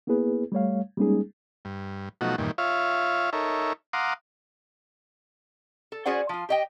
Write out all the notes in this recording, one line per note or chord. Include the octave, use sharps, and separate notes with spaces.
A#3 B3 E4 G#4 B4
G3 A3 C#5 F5
G3 G#3 A#3 C#4 D#4 G#4
G2
B2 F3 F#3 A3 D#4 F#4
E2 G2 A#2 D#3
F4 C#5 E5 F5
D#4 A4 A#4 C#5 E5
F5 F#5 A#5 C6 D6 D#6
A4
C#4 F#4 G#4 C5 D5 F#5
F3 F4
G4 D#5 G5